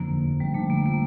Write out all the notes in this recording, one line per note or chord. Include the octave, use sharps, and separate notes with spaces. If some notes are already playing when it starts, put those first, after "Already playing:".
Already playing: F2 D3 A#3
F1
F2
F2 G3
D3 A3
F3 A#3
F3 A#3